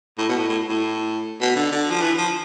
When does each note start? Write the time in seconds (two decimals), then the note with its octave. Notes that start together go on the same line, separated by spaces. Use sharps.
0.18 A2
0.29 B2
0.38 A2
0.49 A2
0.68 A2
1.41 B2
1.56 D3
1.71 D3
1.90 F3
2.01 E3
2.17 F3